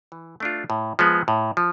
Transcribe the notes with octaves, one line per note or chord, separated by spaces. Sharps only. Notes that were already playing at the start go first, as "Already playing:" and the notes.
E3
A3 D4 F4
A2
F3 G#3 B3
A2
F3